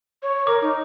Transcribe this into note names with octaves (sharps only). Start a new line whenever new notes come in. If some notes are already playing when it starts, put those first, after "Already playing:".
C#5
A#4 D6
D#4